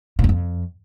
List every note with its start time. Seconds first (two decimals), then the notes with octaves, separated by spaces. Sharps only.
0.19 A#2
0.24 F#2
0.29 F2